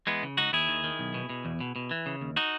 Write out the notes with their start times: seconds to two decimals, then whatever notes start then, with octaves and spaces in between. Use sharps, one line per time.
0.07 E3 G#3 B3
0.23 C#3
0.37 C#2 D#4 F#4
0.53 D#2 E4 G#4
0.69 D#3
0.84 D#3
0.99 B1
1.14 B2
1.30 B2
1.45 E2
1.60 B2
1.76 B2
1.91 E3
2.06 C#3
2.21 D#2
2.36 D#4 F#4